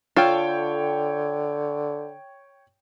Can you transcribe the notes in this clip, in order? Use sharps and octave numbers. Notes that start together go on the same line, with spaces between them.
D3 F4 A4 C#5 G5